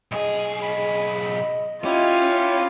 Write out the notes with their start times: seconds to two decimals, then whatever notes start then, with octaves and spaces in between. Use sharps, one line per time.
0.12 B1 G#4 D#5
0.62 B5
1.85 C#4 E4 F4 G4